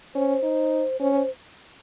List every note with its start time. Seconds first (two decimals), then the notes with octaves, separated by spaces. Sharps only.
0.15 C#4 C5
0.43 D#4
1.00 C#4 C5
1.14 C5